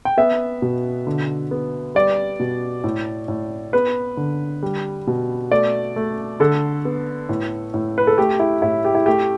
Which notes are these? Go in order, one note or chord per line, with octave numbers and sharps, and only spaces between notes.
G5
B3 E5
B2
D3
B3
G3 D5
B2
A2
A2
B3 B4
D3
G3
B2
A3 D5
A3
D3 A4
B3
A2
A2
B4
A4
A3 G4
E4
A2 E4
G4
E4
A3 G4